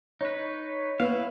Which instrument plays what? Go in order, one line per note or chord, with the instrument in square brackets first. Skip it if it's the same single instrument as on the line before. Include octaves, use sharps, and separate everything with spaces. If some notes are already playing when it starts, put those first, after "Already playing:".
[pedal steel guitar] D#4 B4 [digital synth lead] C#5
[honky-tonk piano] B3 [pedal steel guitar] E4 F5